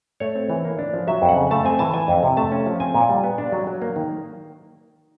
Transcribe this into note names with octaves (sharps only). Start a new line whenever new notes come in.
A3 C#5
C4
E3
A#3
D4
F3
F#3 E5
F2
F#5
C#3
A3 A5
C4 G#5
E3 A5
E3 G#5
F2
C3
A3 A5
C#4
F3
C4 G#5
A#2
G3
B3
D4
F#3
F#3
A#3
D#3